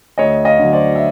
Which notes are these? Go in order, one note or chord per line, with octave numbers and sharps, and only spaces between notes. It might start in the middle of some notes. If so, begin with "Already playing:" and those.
D2 C#5 D#5
D#5 F5
D3 F#3
C5 D5
E5